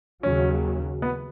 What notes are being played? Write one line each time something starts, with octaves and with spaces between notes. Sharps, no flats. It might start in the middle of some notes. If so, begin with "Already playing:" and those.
D#2 C#3 F#3 C#4
B3